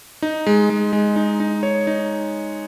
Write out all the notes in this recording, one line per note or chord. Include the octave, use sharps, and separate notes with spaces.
D#4
G#3
G#3
G#3
D#4
D#4
C#5
D#4